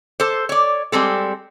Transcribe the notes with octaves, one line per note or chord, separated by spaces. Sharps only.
A4 C5
C#5 D5
G3 G#3 C4 A4